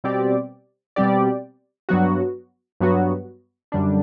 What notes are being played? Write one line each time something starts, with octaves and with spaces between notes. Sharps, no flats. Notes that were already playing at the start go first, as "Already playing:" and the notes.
B2 G3 C4 G4 D5
B2 G3 C4 G4 D5
G2 F#3 B3 F#4
G2 F#3 B3 F#4
F#2 D3 G3 D4